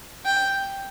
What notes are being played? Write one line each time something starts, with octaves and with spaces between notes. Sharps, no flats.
G5